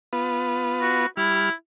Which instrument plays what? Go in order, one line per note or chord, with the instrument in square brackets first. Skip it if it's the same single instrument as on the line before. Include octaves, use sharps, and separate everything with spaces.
[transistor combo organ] B3 F4 B4
[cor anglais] F#4
[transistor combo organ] G3 F6 [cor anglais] E4